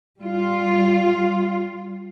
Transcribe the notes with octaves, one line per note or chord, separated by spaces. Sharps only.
G3 F4